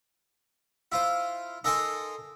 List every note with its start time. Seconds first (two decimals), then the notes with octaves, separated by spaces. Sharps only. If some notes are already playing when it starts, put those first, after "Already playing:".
0.92 E4 F4 C5
1.64 D#4 A4 A#4 G#5 A5 C6